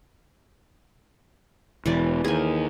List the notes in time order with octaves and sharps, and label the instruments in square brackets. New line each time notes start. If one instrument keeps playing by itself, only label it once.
[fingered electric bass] E1 [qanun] E3 B4 D5
[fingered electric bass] D#2 [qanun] G#4 G#5